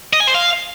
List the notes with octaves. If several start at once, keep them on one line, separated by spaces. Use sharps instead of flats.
D#5
G#5
C5
F5